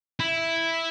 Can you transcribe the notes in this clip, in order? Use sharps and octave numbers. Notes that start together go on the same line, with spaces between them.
E4